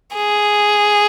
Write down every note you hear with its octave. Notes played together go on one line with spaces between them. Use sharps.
G#4